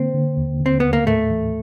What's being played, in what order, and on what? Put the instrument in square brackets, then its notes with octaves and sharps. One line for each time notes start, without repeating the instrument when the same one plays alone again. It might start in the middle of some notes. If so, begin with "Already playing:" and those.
Already playing: [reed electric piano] D3 A#3 [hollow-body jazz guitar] C4
[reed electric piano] D3
D#2
D3
[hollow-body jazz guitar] C4
[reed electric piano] D#2 [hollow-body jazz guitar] B3
[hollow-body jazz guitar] A#3
[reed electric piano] A2 [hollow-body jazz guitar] A3
[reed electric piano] E3